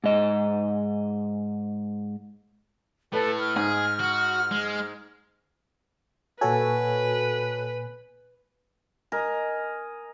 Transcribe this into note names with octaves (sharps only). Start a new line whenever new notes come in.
G#2 D#5
A2 A4 B4
F6
G#2 G#4
F#4
G#3
A#2 F#4 A4 B4 C#5 G#5
A#4 D#5 G#5